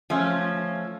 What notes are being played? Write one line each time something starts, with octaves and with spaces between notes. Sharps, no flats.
F3 A3 C#4